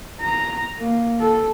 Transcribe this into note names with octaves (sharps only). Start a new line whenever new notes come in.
A#5
A#3
A4